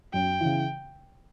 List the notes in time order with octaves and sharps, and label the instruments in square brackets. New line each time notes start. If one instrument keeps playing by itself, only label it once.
[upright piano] F#2 [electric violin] G5
[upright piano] C#3 E3